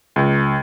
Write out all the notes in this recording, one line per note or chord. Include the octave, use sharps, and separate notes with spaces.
C#2